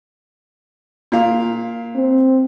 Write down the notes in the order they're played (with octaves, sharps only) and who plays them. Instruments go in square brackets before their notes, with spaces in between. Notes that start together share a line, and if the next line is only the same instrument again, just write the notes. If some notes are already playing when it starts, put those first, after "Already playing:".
[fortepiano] A#2 F5
[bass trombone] C4